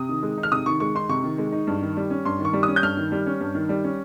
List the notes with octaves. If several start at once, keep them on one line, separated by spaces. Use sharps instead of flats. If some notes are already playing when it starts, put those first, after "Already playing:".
Already playing: C3 D#6
D#3
G#3
D#4
F6
C3 D#6
D#3 C#6
G#3 C#6
D#4 C6
C3 C#6
D#3
G#3
D#4
G2
D#3
G3
C#4
G2 C6
D#3
C#6
G3
C#4 D#6
G6
G2 F6
D#3
G3
C#4
G2
D#3
G3
C#4